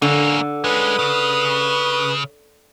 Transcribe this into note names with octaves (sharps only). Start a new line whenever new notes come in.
D3 A#3 C#4
G#3 C#4 B4 D#6
C#3